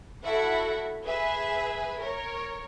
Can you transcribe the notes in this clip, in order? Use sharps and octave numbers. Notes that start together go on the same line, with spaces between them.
E4 F#4 A4 E5 F#5
G#4 B4 E5
A#4 C#5